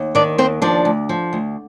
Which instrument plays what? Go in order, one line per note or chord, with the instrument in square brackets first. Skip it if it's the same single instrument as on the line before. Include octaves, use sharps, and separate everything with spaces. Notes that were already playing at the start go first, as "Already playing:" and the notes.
Already playing: [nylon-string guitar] D#2
D#3 D4 D5
D#2 C4 C5
F3 D4 D5
D2
F3
D2